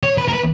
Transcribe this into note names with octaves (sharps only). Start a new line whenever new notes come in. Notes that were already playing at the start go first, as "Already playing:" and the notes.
C#5
B4
A#4
B4